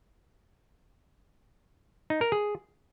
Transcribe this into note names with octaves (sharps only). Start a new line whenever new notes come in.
D#4
A#4
G#4